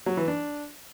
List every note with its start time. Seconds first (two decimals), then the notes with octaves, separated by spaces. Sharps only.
0.06 F#3
0.17 E3
0.28 D4